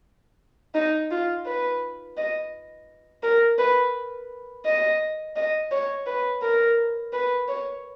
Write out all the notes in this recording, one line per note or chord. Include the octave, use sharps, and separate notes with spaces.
D#4
F4
B4
D#5
A#4
B4
D#5
D#5
C#5
B4
A#4
B4
C#5